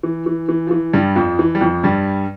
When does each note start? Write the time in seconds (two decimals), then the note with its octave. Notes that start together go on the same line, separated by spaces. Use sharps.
0.03 E3
0.26 E3
0.49 E3
0.67 F3
0.71 E3
0.93 G2 G3
1.16 F2 F3
1.39 E3
1.55 G3
1.61 F2 F3
1.83 G2 G3